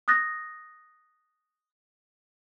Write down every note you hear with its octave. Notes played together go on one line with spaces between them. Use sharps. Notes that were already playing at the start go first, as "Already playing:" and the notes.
D#6 F#6 A6 A#6